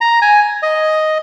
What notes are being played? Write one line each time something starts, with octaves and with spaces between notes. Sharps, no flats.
A#5
G#5
D#5